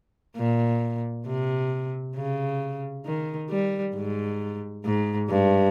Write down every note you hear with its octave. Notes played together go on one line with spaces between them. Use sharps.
A#2
C3
C#3
D#3
G3
G#2
G#2
G2